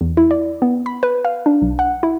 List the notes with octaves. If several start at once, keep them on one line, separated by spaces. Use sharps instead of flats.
E2
E4
D5
B3
B5
B4
F5
D4
B1
F#5
E4